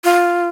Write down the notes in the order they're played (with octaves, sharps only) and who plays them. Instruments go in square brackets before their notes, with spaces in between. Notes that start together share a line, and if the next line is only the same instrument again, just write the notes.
[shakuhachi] F4